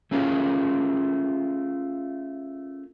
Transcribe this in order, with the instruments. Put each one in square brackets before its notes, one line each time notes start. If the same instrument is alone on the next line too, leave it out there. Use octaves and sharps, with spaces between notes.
[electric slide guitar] A3 C#4 F4 G#4 A#4